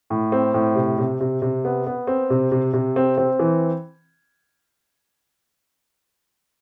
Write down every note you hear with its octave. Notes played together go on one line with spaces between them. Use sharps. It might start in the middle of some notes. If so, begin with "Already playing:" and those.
A2
C4
A2
C3
C3
C3
C3
B3
B3
C4
C3
C3
C3
C4
C4
E3